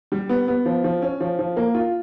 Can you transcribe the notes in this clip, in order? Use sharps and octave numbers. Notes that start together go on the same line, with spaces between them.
G3
B3
B3
F3
F3
C#4
F3
F3
A#3
F4